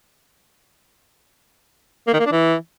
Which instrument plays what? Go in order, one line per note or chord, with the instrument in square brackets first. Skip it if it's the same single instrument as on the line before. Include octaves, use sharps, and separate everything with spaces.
[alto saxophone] A#3
D#3
A#3
D4
E3